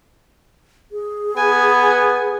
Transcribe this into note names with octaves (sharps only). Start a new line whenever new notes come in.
G#4
B3 G#5